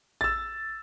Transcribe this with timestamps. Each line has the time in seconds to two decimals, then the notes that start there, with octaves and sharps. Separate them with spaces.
0.21 E6 A6